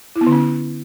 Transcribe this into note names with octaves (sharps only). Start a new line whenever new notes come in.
E4
B3
D3
C#4